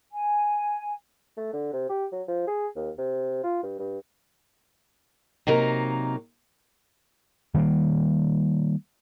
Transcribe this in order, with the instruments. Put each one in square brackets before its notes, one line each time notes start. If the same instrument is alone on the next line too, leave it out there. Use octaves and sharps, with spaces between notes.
[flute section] G#5
[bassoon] A3
D3
C3
G4
F#3
F3
G#4
D#2
C3
F4
G2
G2
[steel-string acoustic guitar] C3 F#3 A#3 D#4 A#4
[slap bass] D#3 G3 G#3 A#3